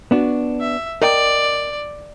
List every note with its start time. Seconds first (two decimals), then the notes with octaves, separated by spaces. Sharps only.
0.11 B3 D4 F#4
0.60 E5
1.02 A#4 D5 D#5 G5